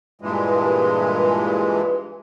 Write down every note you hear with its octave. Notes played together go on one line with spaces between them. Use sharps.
G2 A#2 E3 G#3